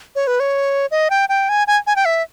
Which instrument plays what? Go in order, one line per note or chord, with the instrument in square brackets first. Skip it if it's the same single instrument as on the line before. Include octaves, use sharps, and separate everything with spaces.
[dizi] C#5
B4
C#5
D#5
G5
G5
G#5
G#5
G#5
G5
E5